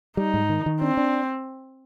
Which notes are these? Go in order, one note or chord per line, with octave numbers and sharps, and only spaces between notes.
G3 D#4
G#2
D#3
D#3
C4 D4
D4